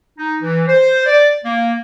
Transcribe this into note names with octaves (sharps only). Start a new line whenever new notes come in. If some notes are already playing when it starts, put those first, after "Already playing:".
D#4
E3
C5
D5
A#3